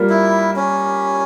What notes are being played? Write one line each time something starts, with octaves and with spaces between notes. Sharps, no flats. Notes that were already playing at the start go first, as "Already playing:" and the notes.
Already playing: G3 A#3 F4 A#4
E4
C#4